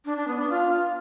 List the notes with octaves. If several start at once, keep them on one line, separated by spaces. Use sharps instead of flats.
D4
D4
B3
D4
F4